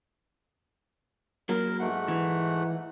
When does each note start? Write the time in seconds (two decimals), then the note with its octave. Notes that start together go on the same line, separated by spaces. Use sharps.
1.49 F#3 A#3 A#4
1.80 G#2 A3 F#5
2.08 E3